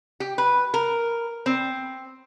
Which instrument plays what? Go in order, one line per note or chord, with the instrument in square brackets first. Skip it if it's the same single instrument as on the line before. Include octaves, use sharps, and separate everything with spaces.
[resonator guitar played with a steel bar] G4
B4
A#4
C4